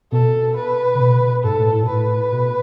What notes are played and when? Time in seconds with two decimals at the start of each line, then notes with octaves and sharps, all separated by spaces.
0.12 B2 A4
0.56 B4
0.95 C#3
1.00 B2
1.44 G#2 A4
1.59 A2
1.73 A2
1.83 B2
1.88 A2 B4
2.32 B2